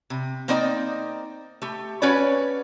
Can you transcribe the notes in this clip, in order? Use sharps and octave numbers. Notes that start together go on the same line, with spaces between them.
C3
A#3 C4 D#4 D5 D#5 G5
A3 G4
C#4 F#4 B4 C#5 D5